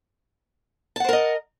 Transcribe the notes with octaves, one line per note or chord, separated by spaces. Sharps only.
A#4 C5 D#5 F#5 A5